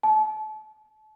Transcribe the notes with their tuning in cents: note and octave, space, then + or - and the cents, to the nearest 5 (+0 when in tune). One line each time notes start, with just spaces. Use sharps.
A5 -35